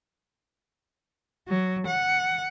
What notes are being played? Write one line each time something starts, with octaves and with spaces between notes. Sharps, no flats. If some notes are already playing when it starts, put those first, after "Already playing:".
F#3
F#5